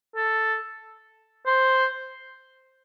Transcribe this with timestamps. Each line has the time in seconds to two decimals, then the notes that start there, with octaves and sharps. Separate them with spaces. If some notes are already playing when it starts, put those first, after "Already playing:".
0.16 A4
1.47 C5